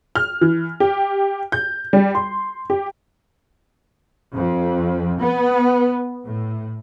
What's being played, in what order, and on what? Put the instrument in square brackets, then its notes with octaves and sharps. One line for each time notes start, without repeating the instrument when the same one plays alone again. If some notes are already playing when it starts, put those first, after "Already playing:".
[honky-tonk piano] F6
E3
G4
G6
G3
C6
G4
[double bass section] F2
B3
A2